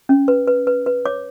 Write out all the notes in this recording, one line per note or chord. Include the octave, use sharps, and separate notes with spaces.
C#4
B4
B4
B4
B4
C#5 D6